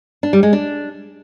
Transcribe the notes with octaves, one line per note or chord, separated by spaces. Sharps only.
D4
G3
G#3
D4